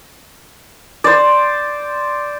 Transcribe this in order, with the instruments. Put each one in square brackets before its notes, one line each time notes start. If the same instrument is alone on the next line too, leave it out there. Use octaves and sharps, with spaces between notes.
[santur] C5 D5